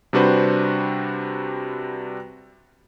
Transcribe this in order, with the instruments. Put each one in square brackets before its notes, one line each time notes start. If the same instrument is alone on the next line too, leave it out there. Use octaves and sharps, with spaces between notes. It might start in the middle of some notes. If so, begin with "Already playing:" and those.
[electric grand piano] C3 G3 D4 F#4 B4 C5